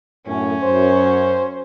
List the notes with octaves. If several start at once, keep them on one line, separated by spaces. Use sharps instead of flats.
F#2 A2 C#4
F#2 C5